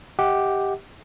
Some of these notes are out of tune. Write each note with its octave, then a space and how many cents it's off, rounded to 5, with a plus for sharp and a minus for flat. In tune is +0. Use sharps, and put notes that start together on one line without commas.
G4 +0 D#5 +40 F#5 +0